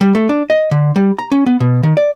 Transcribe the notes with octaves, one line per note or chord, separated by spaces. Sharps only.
G3
A3
D4
D#5
D3
G3
A#5
C#4
B3
B2
D#3
D5